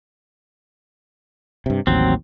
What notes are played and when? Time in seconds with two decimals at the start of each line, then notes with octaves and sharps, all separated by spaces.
1.66 G2 C3
1.87 A1 D#2 F#3 C4